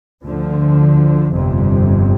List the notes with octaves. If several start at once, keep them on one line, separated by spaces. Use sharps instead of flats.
D2 D3 F3
G1 F2 C3